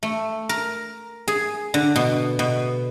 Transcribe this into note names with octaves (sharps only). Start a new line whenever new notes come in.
A3
A#4
G#4
D3
B2
B2